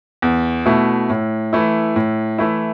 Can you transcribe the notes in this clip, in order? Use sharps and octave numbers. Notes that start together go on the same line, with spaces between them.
E2
B2 A3 E4
A2
E3 A3 E4
A2
E3 A3 E4